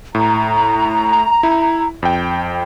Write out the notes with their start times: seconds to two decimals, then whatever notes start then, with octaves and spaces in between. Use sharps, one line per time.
0.15 A2 A#5
1.43 E4
2.03 F2 G5